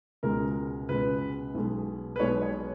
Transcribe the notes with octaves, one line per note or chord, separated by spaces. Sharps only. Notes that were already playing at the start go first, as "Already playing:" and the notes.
C#2 B2 G#3 A#4
C#2 B2 G#3 B4
B1 B2 G#3
B4
B1 B2 G#3 C#5
C#5